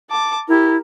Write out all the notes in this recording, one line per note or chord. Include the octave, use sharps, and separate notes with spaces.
A5 D6
E4 G4 A#4